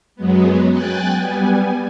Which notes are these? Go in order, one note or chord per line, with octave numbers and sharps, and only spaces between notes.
F#2 F#3 G#3 B3
G5 G#5 F#6 A6
G3 B3 G#5